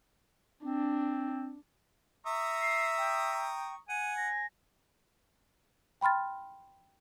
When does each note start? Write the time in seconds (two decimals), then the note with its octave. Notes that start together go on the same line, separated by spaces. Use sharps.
0.65 C4 D4
2.26 E5 A#5 C#6 D#6
2.62 C7
2.98 G5
3.89 F#5 G#5 D#7
4.17 A#6
6.01 G5 B5 C6 F6 A6